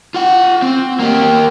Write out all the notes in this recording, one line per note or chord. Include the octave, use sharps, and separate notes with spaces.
F4 F#5
C4
A#3 G4